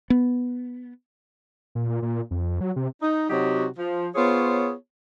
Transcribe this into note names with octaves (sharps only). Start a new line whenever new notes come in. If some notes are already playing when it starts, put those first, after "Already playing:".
B3
A#2
A#2
A#2
F2
F#3
C3
D#4
C3 F#3 D#4 F#4 G4 C#5
F3
B3 F4 G#4 C5 C#5